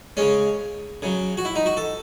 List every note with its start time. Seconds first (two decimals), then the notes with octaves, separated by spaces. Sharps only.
0.17 C#3 G#3 C#4
1.02 C#3 F#3
1.37 F#4
1.45 E4
1.56 D#4
1.66 F#4
1.77 A4